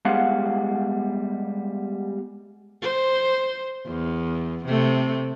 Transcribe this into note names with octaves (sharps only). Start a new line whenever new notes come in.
G3 G#3 B3 F5 F#5
C5
E2
C3 A3